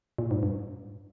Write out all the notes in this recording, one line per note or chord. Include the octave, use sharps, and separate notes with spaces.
A#2
G#2
G2